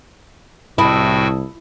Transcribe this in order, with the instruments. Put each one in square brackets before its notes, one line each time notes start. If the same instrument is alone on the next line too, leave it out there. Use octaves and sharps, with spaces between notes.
[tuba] C2 [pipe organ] A2 F#4 G5 [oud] E4 [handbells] A5 D#6 E6